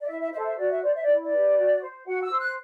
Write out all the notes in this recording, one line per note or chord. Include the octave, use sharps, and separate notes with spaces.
D5
E4 E5
E5
C5 E5
A4
E5
F#4 D5
E5
C5 D5
E5
E4 D5
D5
G4 B4
F#4
C5
F#4 F#5
E6
C5
F#6